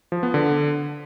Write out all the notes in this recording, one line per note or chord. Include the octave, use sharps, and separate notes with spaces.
F3
B3
D3